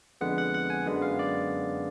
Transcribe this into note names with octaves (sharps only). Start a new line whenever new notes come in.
F2 D3 G#3 B3 F#5
F#5
F#5
G#5
F#2 D3 G#3 B3
F5
D5